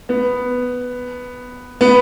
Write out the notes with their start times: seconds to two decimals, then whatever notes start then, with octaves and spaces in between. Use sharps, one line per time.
0.09 B3
1.81 B3